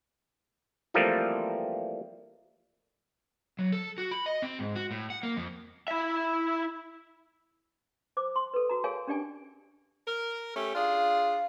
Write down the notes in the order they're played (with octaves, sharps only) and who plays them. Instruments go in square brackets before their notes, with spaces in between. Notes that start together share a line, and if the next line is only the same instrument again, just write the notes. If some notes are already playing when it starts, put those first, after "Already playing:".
[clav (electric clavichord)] E3 F3 G3 A3 A#3 C4
[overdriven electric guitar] F#3
A4
F#4
B5
D#5
C4
G#2
F#4
A2
F#5
A#3
F2
[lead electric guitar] E4 E5
[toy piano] C5 D6
C6
A4 B4
F#4 A#5
G#4 A#4 C#5 F5 G#5
C#4 D4 G4 D5 G#5
[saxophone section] A#4
A3 C#4 G4
[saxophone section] D4 F4 G#4 [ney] F5